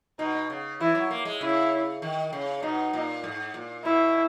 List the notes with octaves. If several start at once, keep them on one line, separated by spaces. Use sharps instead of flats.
B2 D#4
C#3
E3 E4
F#3
A#3
G#3
C#3 E4
D#3
C#3
B2 D#4
A#2
G#2
A#2
B2 E4